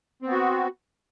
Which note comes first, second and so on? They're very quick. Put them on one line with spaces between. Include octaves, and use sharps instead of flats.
C4 B3 F#4